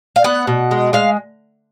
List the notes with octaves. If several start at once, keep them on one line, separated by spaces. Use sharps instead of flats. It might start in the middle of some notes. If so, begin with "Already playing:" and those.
F5
B3 F#5
B2
G#3
G#3 F5